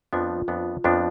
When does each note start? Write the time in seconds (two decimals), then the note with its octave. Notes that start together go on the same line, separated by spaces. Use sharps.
0.13 F2 F3 B3 D4 F4
0.48 F2 F3 B3 D4
0.84 F2 F3 B3 D4 F4